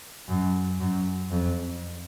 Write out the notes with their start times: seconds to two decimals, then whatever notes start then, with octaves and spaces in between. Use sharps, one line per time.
0.29 F#2
0.79 F#2
1.31 F2